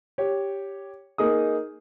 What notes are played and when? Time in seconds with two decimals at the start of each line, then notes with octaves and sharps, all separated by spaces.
0.18 G4 C#5
1.18 A#3 D#4 G#4 D#6